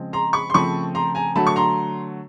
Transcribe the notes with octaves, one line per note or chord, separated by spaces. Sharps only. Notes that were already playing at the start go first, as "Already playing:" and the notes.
Already playing: C#3 F3 G#3 C4
A#5 C6
B5 C#6
C6
C#3 F3 A3 C4 B5 C#6
A#5 C6
G#5 A#5
D3 F#3 A3 A5 B5
C#6
A#5 C6